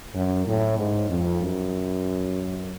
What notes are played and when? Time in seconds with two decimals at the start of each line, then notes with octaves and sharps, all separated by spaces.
0.15 F#2
0.46 A2
0.78 G#2
1.10 F2
1.41 F#2